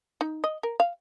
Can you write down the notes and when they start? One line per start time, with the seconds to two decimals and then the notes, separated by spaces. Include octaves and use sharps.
0.21 D#4
0.44 D#5
0.63 A#4
0.80 F5